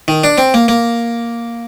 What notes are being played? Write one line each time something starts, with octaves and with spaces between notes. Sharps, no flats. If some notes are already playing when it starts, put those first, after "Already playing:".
D#3
D4
C4
A#3
A#3